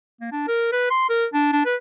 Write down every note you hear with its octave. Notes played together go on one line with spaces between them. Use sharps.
A#3
D4
A#4
B4
C6
A#4
D4
D4
B4